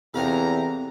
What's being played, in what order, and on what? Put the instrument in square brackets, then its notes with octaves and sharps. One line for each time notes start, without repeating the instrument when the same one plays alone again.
[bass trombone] E2 [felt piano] C3 [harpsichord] C4 F4 A4 [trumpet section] A#5